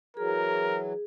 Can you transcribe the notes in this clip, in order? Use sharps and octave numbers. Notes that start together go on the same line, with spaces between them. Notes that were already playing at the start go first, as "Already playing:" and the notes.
E3 F#3 G#4 A#4